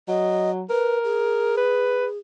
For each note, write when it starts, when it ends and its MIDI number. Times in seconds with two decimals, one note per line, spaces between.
0.08 0.63 54
0.08 0.50 75
0.70 1.56 70
0.70 0.98 71
1.04 2.18 68
1.57 2.06 71